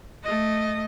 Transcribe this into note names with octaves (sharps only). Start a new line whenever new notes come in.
A3 D#5